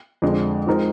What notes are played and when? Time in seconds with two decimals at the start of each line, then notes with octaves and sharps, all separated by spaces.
0.22 F2 D3 G#3
0.67 F3 G#3 C4 D#4 A#4